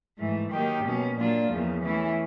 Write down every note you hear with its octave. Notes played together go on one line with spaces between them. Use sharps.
G#2 E3 A3
D#3 F#3 A#3 D#4 G4
B2 F#3 A#3 C#4
A#2 F#3 A#3 D4 F4
E2 C#3 F3 A#3
E3 A3 C#4 E4